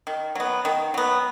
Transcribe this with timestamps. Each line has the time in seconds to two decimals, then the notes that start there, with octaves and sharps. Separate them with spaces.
0.07 D#3
0.35 F#3 B3
0.65 D#3
0.94 F#3 B3